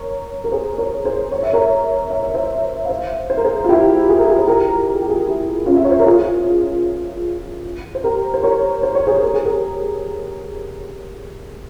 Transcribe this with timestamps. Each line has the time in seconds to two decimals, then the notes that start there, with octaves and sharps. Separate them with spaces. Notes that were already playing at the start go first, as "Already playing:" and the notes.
Already playing: A#4 C#5
0.44 A#4
0.52 G#4 C5
0.78 A#4 C#5
1.05 G#4 C5
1.31 C#5
1.43 E5
1.53 A#4 C#5
2.10 E5
2.23 C#5
2.34 C5 E5
2.85 F5
2.89 C5 E5
3.30 C5
3.37 A#4
3.44 G#4 C5
3.64 F4
3.69 E4 G4
4.09 G#4
4.19 A#4
4.28 F4 G#4
4.38 C5
4.47 G4 A#4
4.88 A#4
4.94 G#4
5.01 G4
5.09 F4 G#4
5.26 E4 G4
5.66 C#4 F4
5.76 E5
5.85 C#5
5.91 C5
5.99 A#4
6.06 F4 G#4
7.95 C5
8.04 G4 A#4
8.34 C5
8.43 A#4 C#5
8.83 C5
8.95 C#5
9.07 G#4 C5
9.22 A#4
9.34 G#4
9.45 G4 A#4